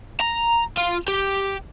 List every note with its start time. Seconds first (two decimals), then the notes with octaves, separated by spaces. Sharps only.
0.21 A#5
0.77 F4
1.08 G4